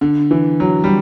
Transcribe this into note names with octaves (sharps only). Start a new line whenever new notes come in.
D3
E3
F#3
G3